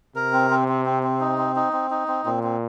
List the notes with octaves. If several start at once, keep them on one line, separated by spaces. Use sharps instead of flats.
C3 A#4
C4
C4
C4
C4
C4
D#4
C4
D#4
C4
D#4
C4
A#2 C4
C4